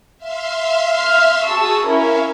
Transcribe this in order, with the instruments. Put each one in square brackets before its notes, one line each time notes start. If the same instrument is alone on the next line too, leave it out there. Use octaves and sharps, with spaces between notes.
[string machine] E5 F5 C6
[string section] F6
[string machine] F#4 G#4 D#6 [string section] A5 C#6 E6
[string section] C#4 E4 A#4 [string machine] E5 F5